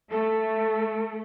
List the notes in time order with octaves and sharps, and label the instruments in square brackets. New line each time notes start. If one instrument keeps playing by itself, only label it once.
[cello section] A3 [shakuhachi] A4